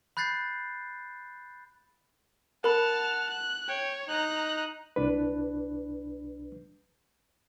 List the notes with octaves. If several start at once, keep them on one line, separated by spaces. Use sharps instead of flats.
B5 F#6 G6 A6 C7
A#4 F#5 A5 B5 F6
F#6
C#5 G5
D#4 A#5 F#6
C2 D4 B4